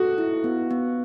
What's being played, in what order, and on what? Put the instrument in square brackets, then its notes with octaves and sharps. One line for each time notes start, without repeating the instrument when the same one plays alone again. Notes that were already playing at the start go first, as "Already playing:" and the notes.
Already playing: [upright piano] F#4 [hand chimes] A4
[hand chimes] E4
B3
B3